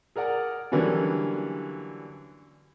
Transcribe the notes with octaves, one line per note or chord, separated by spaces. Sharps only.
G#4 A#4 D5 F#5 A#5
D3 E3 F#3 G3 A#3 C#4